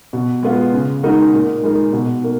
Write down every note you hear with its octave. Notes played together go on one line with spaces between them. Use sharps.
B2
G#3 B3 F4
C#3
G#3 D#4 F#4 A#4
A#2
G#3 D#4 A#4
B2
A#3